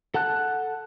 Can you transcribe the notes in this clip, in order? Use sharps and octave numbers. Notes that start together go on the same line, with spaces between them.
A4 F#5 A5 F#6